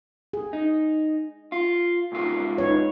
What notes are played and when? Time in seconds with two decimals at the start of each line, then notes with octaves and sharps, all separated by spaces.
0.33 G#4
0.53 D#4
1.52 F4
2.12 C2 G#2 F4
2.58 D#4 B4 C#5